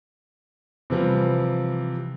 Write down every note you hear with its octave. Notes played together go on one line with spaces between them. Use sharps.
C3 E3 F3 G3